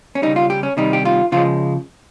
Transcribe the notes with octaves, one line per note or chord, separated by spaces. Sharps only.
C#4
C#3 G3 D#4
F4
G4
C#4
C3 D#3 G3 D#4
G4
F4
C#3 F3 G#3 F4